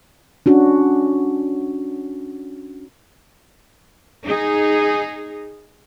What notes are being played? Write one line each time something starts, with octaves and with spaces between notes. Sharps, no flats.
C#4 D4 F#4
D#4 G#4